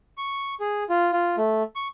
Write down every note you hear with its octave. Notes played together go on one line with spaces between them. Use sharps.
C#6
G#4
F4
F4
A3
C#6